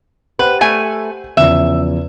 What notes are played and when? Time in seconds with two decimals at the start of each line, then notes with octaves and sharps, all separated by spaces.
0.39 G4 B4 C5 F#5
0.61 A3 G#5
1.37 E2 C#3 F3 E5